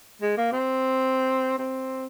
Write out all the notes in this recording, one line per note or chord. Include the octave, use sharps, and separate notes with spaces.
G#3
A#3
C4
C4